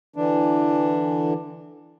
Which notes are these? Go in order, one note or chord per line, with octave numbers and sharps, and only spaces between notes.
D3 E3 D4